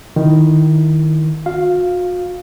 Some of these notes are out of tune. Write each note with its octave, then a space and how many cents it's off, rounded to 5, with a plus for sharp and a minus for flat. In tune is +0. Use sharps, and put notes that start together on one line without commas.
D#3 +0 E4 +0
F#4 -40 F5 +0